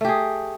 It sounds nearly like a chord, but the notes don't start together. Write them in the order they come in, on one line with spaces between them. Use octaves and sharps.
A3 G4 G#4